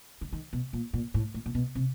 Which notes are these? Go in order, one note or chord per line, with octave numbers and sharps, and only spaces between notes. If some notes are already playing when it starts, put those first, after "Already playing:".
D3
D#3
B2
A#2
A#2
A2
A2
A#2
B2
C3